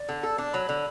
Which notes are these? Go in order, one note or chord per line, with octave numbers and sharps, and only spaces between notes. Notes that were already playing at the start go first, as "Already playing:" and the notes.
Already playing: D5
D3
A4
D4
F#3 B5
D3